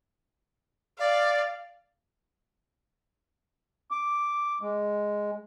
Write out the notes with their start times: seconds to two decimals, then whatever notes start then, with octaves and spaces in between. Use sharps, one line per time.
0.99 D5 F5
3.91 D6
4.61 G#3